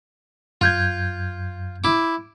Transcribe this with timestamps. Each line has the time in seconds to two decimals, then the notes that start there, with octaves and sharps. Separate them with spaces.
0.61 F#2 F4 G6 G#6
1.84 E4 D6